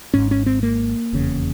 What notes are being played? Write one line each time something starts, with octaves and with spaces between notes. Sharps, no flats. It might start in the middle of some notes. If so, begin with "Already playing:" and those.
G#1 G#2 C#4
C#4
C4
A#3
F1 E2 C#3